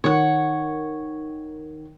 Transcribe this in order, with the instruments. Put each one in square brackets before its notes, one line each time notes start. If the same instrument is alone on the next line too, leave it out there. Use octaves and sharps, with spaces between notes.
[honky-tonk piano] D#3 [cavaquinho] C#5 F#5